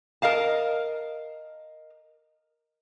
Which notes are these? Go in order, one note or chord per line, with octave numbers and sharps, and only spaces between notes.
A#4 D#5 F5 A5